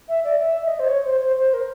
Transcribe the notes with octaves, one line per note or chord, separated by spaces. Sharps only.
E5
D5
E5
D#5
C5
C#5
C5
C5
C5
A#4